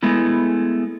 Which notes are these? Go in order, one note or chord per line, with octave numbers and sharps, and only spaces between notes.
G#3 A3 B3 E4